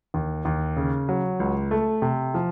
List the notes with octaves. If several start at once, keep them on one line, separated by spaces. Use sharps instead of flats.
D#2
D#2
C#3
F#3
C#2
A3
C3
F3